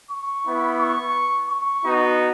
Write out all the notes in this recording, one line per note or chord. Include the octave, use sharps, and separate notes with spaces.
C#6
B3 E4
C#6
C#6
B3 D#4 F#4